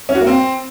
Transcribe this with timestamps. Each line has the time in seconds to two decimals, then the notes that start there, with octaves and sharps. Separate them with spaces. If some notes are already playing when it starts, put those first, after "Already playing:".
0.09 C#4
0.15 F#4
0.21 A#3
0.27 C4